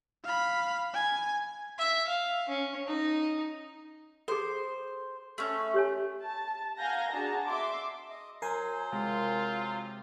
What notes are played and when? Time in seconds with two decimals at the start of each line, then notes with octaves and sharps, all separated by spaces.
0.24 F5 B5
0.94 G#5
1.79 E5
2.07 F5
2.49 C#4
2.87 D#4
4.28 G#4 A4 C5
5.38 A3 C#4
5.74 G4 C#5 G#5
6.24 A5
6.78 F5 F#5 G#5 A#5 G6 A#6
7.12 D4 F#4 G#4 A5 A#5
7.46 E5 C6 D6
8.10 D#5
8.42 F#3 A#4 C5 G#5 C7
8.92 C3 G#3 F4